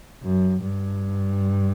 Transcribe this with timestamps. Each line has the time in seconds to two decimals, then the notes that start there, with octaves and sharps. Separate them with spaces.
0.23 F#2
0.62 G2